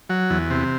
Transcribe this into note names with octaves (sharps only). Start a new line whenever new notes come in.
F#3
E2
C3